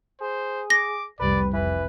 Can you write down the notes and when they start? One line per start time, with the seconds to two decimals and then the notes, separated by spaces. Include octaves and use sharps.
0.21 G#4 C5
0.70 D6 A#6
1.20 F1 C2 G3 B4 D5
1.53 F1 E3 B4